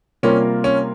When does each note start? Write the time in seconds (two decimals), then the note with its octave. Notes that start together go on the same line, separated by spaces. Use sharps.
0.23 C3 G3 A#3 C#4 F4 A#4
0.64 C#4